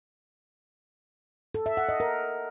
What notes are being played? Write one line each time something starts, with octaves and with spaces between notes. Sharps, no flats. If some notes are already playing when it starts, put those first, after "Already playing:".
A4
E5
F#5
D#5
A#4